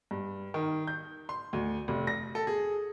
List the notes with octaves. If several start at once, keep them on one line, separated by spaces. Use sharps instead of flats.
G2
D#3
G6
C6
D2
F1
A#6
A4
G#4